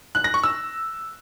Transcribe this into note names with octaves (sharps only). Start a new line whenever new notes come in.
F#6
A#6
C#6
E6